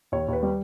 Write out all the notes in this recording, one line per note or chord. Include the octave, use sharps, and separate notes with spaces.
D#2 C#5
D#2 B4
G3